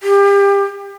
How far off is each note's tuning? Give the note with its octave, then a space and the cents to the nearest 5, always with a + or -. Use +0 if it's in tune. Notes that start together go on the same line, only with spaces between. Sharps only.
G4 +30